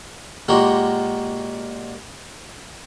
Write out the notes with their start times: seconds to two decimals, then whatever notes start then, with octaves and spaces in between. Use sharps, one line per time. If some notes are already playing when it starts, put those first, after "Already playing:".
0.48 A#2 G#3 A#3 F#4 G4